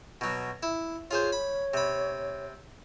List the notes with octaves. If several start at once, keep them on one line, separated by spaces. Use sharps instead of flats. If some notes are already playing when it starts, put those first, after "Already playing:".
B2 F#3
E4
F4 G#4 C5 C#5
B5
C3 B5